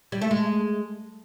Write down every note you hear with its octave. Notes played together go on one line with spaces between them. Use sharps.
G3
A3
G#3